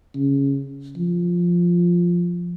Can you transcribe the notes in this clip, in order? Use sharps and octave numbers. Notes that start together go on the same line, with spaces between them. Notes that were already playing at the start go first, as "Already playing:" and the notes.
C#3
F3